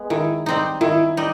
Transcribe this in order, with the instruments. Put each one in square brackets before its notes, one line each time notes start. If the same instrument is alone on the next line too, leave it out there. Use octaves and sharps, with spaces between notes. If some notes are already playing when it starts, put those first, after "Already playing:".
Already playing: [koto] G#3 B3
[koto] D#3 [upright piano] E4
[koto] G3 C4 D#4
[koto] D#3 [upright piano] E4
[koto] G3 D#4